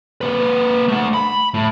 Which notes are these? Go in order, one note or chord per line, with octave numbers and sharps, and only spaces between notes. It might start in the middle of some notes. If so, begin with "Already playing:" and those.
A#3 B4
A3 F#5
B5
A2